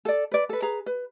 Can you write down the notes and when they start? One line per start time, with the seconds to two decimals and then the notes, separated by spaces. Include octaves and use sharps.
0.05 A4 D5
0.31 B4 D5
0.49 A4 B4
0.62 G#4 B4 A#5
0.86 B4